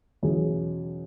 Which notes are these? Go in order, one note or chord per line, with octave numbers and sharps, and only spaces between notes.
E2 B2 F#3 C#4 G#4